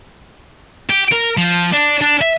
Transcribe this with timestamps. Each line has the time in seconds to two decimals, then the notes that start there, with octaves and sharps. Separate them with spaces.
0.89 G4
1.12 A#4
1.37 F3
1.72 D4
2.01 D4
2.21 E5